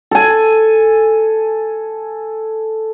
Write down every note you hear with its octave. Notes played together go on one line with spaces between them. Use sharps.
A4 G#5